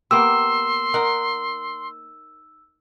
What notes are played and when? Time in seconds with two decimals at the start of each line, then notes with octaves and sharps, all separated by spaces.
0.11 A#3 B3 G4 C6 E6
0.94 D#4 A#4 F#5